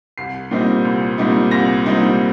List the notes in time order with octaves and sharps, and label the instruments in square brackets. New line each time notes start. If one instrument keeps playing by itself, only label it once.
[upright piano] C2 C7
A#2 G3 C4 D#4
C2
A#2 G3 C4 D#4
C2 A#6
A#2 G3 C4 D#4